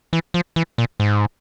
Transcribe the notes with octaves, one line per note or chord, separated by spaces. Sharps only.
E3
F3
E3
A#2
G#2